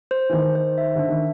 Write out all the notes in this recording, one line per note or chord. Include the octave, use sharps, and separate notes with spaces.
C5
E3
D#3 C5
C5
E5
D3 D4
D#3